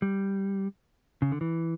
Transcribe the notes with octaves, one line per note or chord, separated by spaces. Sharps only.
G3
C#3
D3
E3